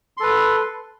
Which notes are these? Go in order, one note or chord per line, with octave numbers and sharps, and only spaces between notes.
A4 B4 C6